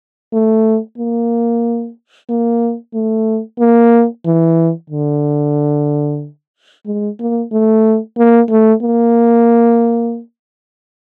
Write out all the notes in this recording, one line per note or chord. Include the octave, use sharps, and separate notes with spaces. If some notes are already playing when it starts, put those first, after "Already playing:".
A3
A#3
A#3
A3
A#3
E3
D3
G#3
A#3
A3
A#3
A3
A#3